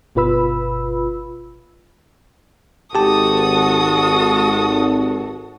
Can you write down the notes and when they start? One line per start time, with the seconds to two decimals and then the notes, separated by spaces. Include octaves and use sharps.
0.15 G1 B2 F4 B4 B5 E6
2.95 G#1 F#4 G4 A4 A5 D#6